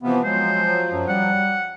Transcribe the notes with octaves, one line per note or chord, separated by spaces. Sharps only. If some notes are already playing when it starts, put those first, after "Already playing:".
C3 E3 F3 B3
F3 F#3 G#3 C5
F#2
G3 F#5